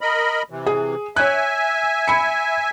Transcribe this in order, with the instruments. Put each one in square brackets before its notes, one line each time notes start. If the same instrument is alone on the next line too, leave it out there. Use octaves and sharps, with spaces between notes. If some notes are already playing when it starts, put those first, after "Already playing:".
[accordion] A#4 D#5 B5
C3 E3
[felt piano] G#4
[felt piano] C#5 F#6 [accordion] E5 G#5
[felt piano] B5 C#7